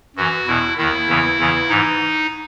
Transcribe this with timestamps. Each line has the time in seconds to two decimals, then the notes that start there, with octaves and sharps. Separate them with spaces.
0.16 F#2 E3 F#4
0.47 E2 B2 E4
0.77 D#2 D#3 E4
1.08 E2 C#3 E3
1.38 E2 C#3 E3
1.69 G#2 E3 D#4